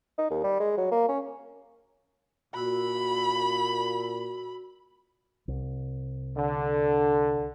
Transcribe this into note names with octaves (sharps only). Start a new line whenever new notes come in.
D#4
D#2
G3
G#3
F#3
A#3
C#4
A#2 F#4 B5 E6
C2
D3